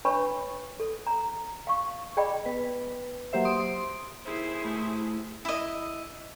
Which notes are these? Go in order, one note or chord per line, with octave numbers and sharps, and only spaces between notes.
D4 B4 C#5 A5 B5 C#6
A4
A#5
F5 C#6
G#4 D5 D#5 G5 B5
B3 B4
F#3 A#3 G4 C5 E5
C6 D#6 D7
D#2 E4 G#4 C5
A2
E4 D#5